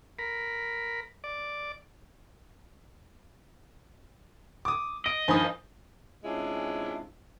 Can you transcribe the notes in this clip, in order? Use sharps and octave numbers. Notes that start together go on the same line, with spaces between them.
A#4 B5
D5
D6 D#6
D#5 D7
G2 D#3 F3 G#5 B5 D#6
C3 G#3 C#4 D4 E4 F4